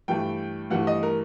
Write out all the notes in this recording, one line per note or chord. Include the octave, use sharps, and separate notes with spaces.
G2 E3 A3 G5
G2 E3 A3 F#5
D#5
A#4